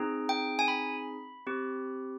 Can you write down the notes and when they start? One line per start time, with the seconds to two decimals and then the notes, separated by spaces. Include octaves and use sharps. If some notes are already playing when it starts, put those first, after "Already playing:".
Already playing: C4 D#4 G#4
0.29 G5
0.59 G#5
0.68 B5
1.47 C4 G4